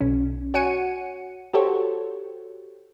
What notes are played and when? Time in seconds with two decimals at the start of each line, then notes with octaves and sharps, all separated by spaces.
0.01 B1 C#4
0.54 F#4 C#5 F#5 G#5 C#7 D#7
1.53 F#4 G4 A4 C5 C#5